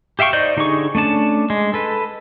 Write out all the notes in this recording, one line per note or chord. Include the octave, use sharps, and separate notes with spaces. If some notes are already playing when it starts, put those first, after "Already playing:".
G4 E5 F5 G5 C#6
D#4 C5 D5 D#5 G6
D3 D#4 G4 G#4 C#6
A3 C#4 D4 A5
G#3
A4 B4